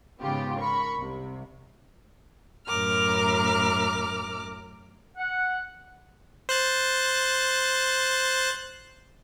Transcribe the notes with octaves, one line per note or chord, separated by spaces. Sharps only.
G#2 C#3 B3 F4 G4
A#4 B5 C#6
C2 C3
F#2 A2 A#4 D6 F6
F#5
C5 F#6 A6